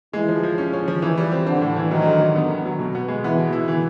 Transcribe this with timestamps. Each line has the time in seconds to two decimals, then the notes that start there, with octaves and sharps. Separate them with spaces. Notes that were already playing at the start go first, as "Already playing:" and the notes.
0.13 E3 G#3
0.28 F3
0.43 F3
0.58 C#4
0.73 C#4
0.88 F3
1.02 D#3 E3
1.17 G3
1.32 C4
1.46 D3 C4
1.61 A2
1.76 E3
1.91 D#3 F#3
2.06 D3
2.21 D3
2.36 B3
2.50 B3
2.65 F#3
2.79 B2
2.95 B3
3.08 G#3
3.24 E3 B3
3.38 B2
3.53 E4
3.68 E3